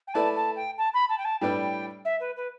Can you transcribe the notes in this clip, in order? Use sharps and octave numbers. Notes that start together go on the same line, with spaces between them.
G5
A3 E4 B4 D5 A5
A5
G5
A5
B5
A5
G5
A5
A2 G3 D4 B4 D5 G5
E5
B4
B4